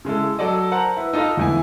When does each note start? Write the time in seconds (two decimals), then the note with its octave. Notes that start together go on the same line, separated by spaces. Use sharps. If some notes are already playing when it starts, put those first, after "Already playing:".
0.05 C#3 G#3 E4 A4
0.39 F#3 A4 D5 D#5
0.71 A#4 C5 F#5 A5 A#5
0.97 E4 B4
1.13 D#4 F4 A4 D#5 F5
1.37 E2 D3 E3 E4 G#5